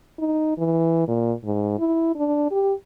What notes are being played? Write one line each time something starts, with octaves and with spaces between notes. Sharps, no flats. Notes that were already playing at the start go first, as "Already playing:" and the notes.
D#4
E3
A#2
G#2
E4
D4
G4